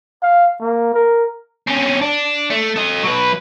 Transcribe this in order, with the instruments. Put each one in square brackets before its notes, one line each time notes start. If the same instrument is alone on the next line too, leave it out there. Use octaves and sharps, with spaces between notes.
[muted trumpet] F5
A#3
A#4
[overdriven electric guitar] C4 C#4
D4
A3
A4 D#5
F#3 B4